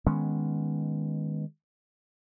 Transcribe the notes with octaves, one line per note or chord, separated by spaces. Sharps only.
D#3 G#3 B3 C#4